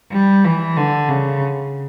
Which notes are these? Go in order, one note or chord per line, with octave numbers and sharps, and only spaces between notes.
G3
E3
D3
C#3